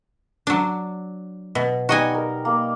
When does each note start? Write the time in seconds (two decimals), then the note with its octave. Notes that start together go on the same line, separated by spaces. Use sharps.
0.47 F#3 D4
1.55 B2
1.89 G3 B3 D#4 F#4 D#5 G#5
2.14 A#4
2.45 A#3